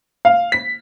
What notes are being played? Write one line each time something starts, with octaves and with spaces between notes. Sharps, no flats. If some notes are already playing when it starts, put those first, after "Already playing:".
F5
B6